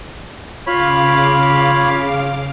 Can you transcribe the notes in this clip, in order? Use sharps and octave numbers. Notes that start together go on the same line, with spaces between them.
C#3 F4 C#5 F5 B5 D6